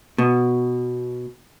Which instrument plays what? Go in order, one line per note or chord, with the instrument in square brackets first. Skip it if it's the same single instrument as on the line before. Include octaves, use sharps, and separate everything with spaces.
[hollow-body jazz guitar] B2